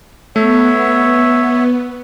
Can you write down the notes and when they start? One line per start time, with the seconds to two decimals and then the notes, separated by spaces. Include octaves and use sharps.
0.36 A3 B3 C#5 E5